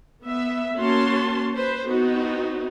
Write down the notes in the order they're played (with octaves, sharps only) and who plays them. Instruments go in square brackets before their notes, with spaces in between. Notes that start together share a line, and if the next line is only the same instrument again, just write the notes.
[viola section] B3 E5
A#3 C#4 F#4 C#5 A5 C6
B4 C5
B3 C4 D#4 F#4